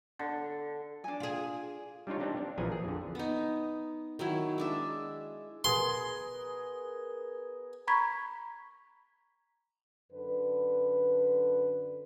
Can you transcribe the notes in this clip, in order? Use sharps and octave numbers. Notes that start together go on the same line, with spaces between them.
D3
D4 G#5
F4 G#4
G3 D4 D#4 F4 C#5
C4 D4 D#4 G4
D4
A#1 E3 F3 G#4 G#5 A#5
G#4
F2 D3
B3 D#4
D#3 F#3 E4
G#3 D4 E5
B3 G#4 A#4 C6
A#5 B5 C#6 G#6 B6
F#2 D3 B4